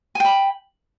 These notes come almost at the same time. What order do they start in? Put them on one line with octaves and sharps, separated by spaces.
G#5 G5 B5